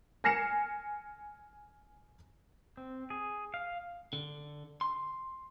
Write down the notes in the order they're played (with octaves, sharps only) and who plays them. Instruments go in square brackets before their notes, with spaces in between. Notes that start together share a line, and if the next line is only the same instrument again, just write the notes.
[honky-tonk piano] G#5 F6 A#6 C7 C#7 E7
[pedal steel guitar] C4
G#4
F5
[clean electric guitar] D3
C6